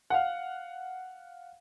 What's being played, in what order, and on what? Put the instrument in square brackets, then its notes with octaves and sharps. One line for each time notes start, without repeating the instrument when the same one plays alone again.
[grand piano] F5 F#5